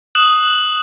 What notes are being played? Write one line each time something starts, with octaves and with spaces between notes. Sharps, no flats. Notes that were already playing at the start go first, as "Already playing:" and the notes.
D#6 F#6 E7 F#7